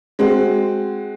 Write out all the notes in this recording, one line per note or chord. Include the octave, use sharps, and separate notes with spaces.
G#3 C4 F#4